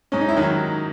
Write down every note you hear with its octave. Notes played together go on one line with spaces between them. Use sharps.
G#2 C#4
D#4
E4
D#3 F#3